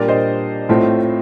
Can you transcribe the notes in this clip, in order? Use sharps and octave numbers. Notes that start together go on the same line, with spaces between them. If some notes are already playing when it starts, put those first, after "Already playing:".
Already playing: A#2 G3 D4 A#4 D5
C5 D#5
A2 A3 C4 F4